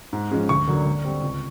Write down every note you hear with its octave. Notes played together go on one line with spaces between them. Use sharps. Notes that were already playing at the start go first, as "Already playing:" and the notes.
G#2
F3 G#3 C#4
D2 C#6
D3 F#3 A#3 D4
D3
G3 C4
C#2